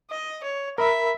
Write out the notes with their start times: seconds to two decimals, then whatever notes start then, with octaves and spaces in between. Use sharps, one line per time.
0.10 D#5
0.43 C#5
0.78 A#4 E5 B5